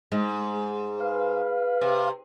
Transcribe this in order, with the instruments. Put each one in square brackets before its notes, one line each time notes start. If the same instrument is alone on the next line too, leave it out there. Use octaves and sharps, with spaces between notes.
[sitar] G#2 [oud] G#3
[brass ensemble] B4 [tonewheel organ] F5
[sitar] C3